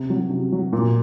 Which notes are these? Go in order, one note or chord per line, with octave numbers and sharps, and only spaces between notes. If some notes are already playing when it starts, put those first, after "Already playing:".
Already playing: C3
F#3
C3
F#3
A#2